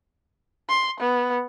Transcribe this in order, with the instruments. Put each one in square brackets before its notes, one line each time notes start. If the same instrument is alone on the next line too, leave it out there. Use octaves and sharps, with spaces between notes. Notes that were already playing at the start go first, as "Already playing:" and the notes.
[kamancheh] C6
B3